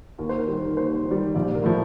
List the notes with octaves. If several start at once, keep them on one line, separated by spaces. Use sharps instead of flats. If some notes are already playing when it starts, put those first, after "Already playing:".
D#2 A#4
C5
A#4
D#3 G3
A#4
D#2 C5
D#3
G3
A#1 D5
A#4
A2 F3 A3